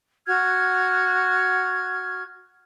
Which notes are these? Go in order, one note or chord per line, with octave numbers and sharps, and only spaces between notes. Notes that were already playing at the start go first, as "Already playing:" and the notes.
F#4 F6 G#6